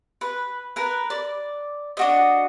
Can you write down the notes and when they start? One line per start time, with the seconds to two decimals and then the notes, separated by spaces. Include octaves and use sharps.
0.21 B4
0.76 A#4 B4
1.10 D5
1.97 D4 F#4 D#5